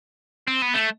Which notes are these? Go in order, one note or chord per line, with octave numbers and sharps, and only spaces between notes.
C4
B3
A3